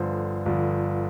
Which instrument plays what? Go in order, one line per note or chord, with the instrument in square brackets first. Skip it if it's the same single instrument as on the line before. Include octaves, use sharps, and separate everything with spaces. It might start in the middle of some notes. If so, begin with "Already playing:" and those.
Already playing: [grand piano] G1 G2 D3 F3 C5
G1 G2 D3 F3